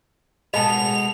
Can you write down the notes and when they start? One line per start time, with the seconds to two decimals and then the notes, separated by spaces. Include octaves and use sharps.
0.54 B2 G#3 A4 D#5 G#5 A5 B5 F7